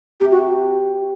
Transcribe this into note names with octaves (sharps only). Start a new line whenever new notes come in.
C3 G4
F#4